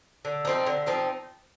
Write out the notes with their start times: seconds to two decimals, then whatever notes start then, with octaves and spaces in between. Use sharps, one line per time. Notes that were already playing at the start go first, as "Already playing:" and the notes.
0.25 D3
0.45 F3 C4 D#4
0.67 D3
0.86 F3 C4 D#4